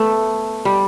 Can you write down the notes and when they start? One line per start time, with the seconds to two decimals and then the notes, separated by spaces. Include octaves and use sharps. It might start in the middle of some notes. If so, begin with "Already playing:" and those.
Already playing: A3 B3
0.65 G3